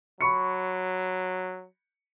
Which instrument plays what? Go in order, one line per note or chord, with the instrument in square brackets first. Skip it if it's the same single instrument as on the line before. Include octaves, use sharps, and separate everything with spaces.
[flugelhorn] F#3 [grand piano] B5 C#6 C#7